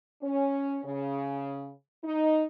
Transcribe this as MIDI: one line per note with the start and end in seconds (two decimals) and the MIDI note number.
0.22 0.78 61
0.84 1.70 49
2.03 2.44 63